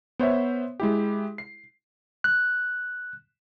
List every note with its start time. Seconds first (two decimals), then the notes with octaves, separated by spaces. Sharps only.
0.19 B3 C5 C#5 E5
0.80 G#3 E4 G4
1.38 C7
2.24 F#6